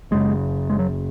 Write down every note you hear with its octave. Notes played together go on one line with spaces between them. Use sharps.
F#1 F#2 C#3 G#3
G#3
F#3